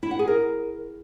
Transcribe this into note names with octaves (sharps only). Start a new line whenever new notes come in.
E4
F#5
G#4
A#4